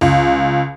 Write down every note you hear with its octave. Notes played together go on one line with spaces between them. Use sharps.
C#2